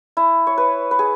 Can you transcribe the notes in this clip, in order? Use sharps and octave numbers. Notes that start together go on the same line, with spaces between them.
E4
C#5
B4
B4
G#4